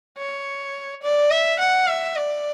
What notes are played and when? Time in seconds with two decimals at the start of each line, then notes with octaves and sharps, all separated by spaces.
0.17 C#5
1.02 D5
1.31 E5
1.59 F#5
1.87 E5
2.16 D5